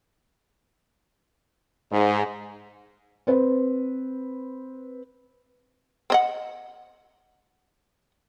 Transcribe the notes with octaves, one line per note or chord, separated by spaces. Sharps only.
G#2
C4 B4 C5
C4 D#5 F#5